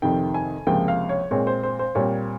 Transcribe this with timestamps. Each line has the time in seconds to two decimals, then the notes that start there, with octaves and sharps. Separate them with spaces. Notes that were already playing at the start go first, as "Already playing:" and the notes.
0.02 F2 C3 D#3 G5
0.34 G#5
0.67 C#2 C3 F3 A#3 G5
0.88 F5
1.09 C#5
1.31 A#2 G#3 C4 C#5
1.47 C5
1.63 C5
1.79 C5
1.95 A#2 G3 C4 C#5